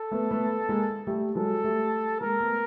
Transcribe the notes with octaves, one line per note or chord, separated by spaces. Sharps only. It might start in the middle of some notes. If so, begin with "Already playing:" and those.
Already playing: A4
A3 B3
A3 B3
G#3 A#3
G3 A3
F#3 G#3 A4
G3 A3
G#3 A#3 A#4
A3 B3